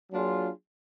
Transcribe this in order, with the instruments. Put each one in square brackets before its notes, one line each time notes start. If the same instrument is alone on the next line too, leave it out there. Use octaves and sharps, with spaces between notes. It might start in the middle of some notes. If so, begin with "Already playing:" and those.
[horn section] F#3 A#3 D4 F4 G#4